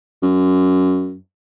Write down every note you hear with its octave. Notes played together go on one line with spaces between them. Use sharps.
F#2